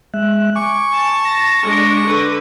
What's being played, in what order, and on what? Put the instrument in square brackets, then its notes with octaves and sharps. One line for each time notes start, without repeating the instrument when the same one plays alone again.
[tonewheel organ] G#3 E5 F#6
[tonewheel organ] G#5 D6 [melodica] C#6
[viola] A5
[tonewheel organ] A#6
[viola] G#3 D4
D3 B4